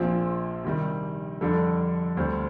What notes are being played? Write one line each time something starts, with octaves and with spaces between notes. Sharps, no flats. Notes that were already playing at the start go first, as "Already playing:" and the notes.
Already playing: A#1 A#2 F3 C4 F4
C3 D#3 G3
F2 D3 G3 D4 A4
D2 D3 G3 C4